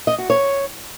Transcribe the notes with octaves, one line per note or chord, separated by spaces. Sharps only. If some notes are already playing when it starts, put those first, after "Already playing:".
D#5
F#4
C#5